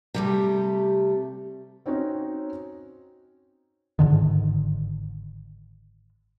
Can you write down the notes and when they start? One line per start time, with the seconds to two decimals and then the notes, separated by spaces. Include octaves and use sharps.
0.14 C3 G3 A3
1.86 C4 C#4 D#4 F#4 C#5
3.99 G1 G#2 D3 D#3